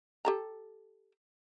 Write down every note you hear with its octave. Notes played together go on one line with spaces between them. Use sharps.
G4 A4 A#5